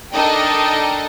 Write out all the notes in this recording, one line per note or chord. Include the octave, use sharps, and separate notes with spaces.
D4 D#4 A4 A#4 D#5 G5